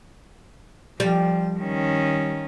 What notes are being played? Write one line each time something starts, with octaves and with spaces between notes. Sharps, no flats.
F3 G3
D#3 C#4